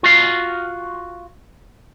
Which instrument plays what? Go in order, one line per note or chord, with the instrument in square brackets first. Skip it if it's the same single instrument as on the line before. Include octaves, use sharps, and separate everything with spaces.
[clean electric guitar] F4 F#4 F5